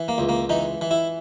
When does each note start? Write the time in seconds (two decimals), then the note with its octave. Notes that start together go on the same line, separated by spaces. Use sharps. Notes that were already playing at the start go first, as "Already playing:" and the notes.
Already playing: E3
0.08 A#3
0.18 C#2
0.29 A#3
0.49 E3 D#4
0.81 E3
0.91 E4